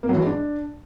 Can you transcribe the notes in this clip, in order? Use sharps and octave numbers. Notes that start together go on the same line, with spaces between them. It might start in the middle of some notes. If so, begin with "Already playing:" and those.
A#3
F#3
E3
G#3
D4